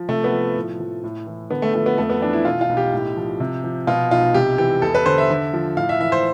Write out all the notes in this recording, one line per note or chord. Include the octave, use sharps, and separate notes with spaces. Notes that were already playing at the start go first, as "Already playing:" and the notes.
Already playing: F3
C3 A3
B3
F3
A2
F3
A2
E3
D3 B3
A3
F3 A3
B3
F2 A3
B3
E3 D4
E4
B2 F4
F4
B1
G4
A2
F3
C3
F3
B2 F4
B1 F4
C3 G4
E3 G4
E2 A4
B4
D3 C5
E5
D3
F3
A2 F5
E5
E3 E5
C5